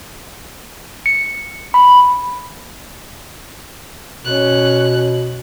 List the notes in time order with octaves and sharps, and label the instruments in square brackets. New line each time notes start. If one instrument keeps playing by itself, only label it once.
[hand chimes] C#7
B5
[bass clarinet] B2 [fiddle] C#4 F#6